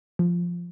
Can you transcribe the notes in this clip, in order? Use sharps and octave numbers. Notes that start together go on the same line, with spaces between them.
F3